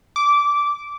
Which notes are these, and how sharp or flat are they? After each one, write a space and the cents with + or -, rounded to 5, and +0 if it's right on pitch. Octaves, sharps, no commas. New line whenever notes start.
D6 -15